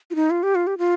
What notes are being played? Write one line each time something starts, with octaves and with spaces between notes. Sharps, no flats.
F4
D#4
F4
G4
F4
G4
F4